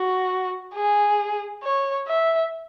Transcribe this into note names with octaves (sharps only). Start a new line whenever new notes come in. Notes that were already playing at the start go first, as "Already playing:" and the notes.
Already playing: F#4
G#4
C#5
E5